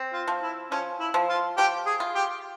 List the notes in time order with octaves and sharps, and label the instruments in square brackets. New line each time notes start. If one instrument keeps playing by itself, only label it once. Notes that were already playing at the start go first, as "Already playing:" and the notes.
Already playing: [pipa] C4
[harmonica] F4
[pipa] F3
[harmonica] E4
[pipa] F3 [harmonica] C#4
[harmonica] E4
[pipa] F3
[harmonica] F4
[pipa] F3 [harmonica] G4
[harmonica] G#4
[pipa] F4
[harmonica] G4